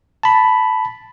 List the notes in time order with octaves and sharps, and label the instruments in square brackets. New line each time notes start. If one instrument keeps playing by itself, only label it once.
[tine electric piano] A5 B5